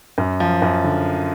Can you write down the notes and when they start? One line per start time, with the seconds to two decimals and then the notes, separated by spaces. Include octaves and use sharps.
0.18 F#2
0.40 F3
0.62 F#2
0.84 D3